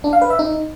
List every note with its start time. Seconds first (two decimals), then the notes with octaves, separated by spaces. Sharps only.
0.04 D4
0.13 F5
0.22 B4
0.30 E5
0.39 D#4